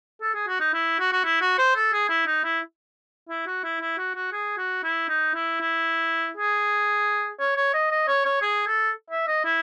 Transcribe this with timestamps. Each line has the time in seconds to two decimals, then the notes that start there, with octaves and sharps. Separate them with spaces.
0.22 A4
0.34 G#4
0.48 F#4
0.60 D#4
0.74 E4
0.99 F#4
1.12 F#4
1.25 E4
1.41 F#4
1.58 C5
1.75 A4
1.93 G#4
2.09 E4
2.26 D#4
2.44 E4
3.29 E4
3.46 F#4
3.64 E4
3.81 E4
3.98 F#4
4.15 F#4
4.32 G#4
4.58 F#4
4.83 E4
5.09 D#4
5.35 E4
5.60 E4
6.37 G#4
7.40 C#5
7.56 C#5
7.73 D#5
7.91 D#5
8.08 C#5
8.25 C#5
8.42 G#4
8.67 A4
9.10 E5
9.27 D#5
9.45 E4